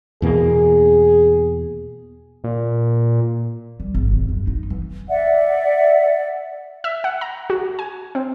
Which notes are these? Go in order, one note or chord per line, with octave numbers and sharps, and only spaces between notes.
E2 B2 A#3 G#4
A#2
G3
G#1
E1
F#2
D#4
E3
D5 E5 F#5
E5
F#5
A#5
F#4
G#5
C4